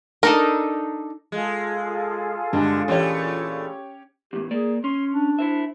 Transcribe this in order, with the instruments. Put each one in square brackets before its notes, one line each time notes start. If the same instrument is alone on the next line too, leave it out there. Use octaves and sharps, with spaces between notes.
[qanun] D4 D#4 A4 [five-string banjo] A#4
[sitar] G#3 [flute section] F4 G#4 A4
[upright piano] G2 G#3 [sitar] D3
[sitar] A#2 E3 A3 [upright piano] C#4 G4 C#5
[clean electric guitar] E2 A2 [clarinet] G4
[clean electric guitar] A#3 D5 [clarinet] G#4
[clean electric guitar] C#4 [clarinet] C6
[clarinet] D4
[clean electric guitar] E4 C5 E5